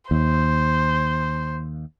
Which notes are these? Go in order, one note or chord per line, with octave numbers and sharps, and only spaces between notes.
D#2 C5